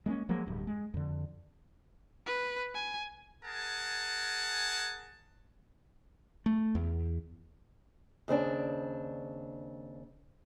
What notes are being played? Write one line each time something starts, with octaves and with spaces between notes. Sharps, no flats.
G#3 A#3 C4 C#4
F3 F#3 G#3 A#3
D1 G2
G#3
F2 D3
B4
G#5
G#4 A#4 F#5 G#5 A5
A3
E2
D#2 C#3 C4 D4